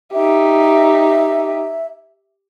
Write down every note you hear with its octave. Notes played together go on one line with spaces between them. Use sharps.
D#4 G4 E5